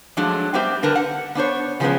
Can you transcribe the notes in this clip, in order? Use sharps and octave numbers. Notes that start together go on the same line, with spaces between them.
F3 F#3 G#3 A3 D4
G3 B3 C4 G4 E5
D3 D4 A#4 B4 A5
F#5
B3 D4 C5 C#5
C#3 F3 G#3 A3 B3 C#4